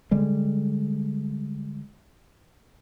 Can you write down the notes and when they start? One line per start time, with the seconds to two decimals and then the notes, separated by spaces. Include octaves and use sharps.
0.11 D3 G3 G#3